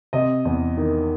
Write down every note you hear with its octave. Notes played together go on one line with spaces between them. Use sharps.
C3 D#5
E2
D#3